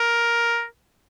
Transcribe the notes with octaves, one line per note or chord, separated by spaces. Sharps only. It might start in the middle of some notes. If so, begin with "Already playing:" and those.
Already playing: A#4